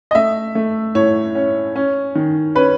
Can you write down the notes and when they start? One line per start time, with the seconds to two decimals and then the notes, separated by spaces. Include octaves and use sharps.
0.11 D#5
0.15 A3 E5
0.55 A3
0.95 A2 C#5
1.35 C#4
1.76 C#4
2.15 D#3
2.55 C#4 B4